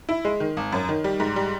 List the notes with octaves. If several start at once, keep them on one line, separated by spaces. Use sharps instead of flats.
E4
G#3
D#3
G#1
F#2
D#3
G3
G#2
G3